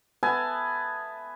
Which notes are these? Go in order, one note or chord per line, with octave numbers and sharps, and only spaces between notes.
B3 E5 G#5 A5